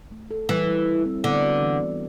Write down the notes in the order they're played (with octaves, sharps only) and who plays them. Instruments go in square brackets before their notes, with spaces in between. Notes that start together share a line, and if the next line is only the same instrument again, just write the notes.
[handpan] A3
A4
[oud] E3 [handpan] G3
[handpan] G3
E4
C4
[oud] D3 [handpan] B3
[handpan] F#4
E3
D4